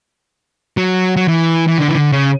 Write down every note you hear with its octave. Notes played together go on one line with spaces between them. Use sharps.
F#3
F#3
E3
E3
D3
E3
D3
C#3